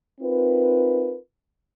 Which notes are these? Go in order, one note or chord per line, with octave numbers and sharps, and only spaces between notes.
C4 D#4 F4 A#4 B4